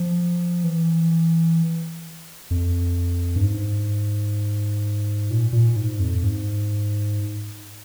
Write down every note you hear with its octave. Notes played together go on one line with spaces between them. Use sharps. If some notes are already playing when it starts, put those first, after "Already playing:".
Already playing: F3
E3
F2
G2
G#2
A#2
A#2
G#2
F2
G#2